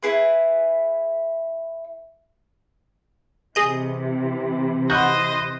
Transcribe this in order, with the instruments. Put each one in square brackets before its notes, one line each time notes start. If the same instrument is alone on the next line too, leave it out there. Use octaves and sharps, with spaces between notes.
[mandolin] E4 G#4 B4
[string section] C3 E3 [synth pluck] G#4 D#5 G6
[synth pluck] F#4 [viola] C5 D#5 [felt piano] B5 F#6 G6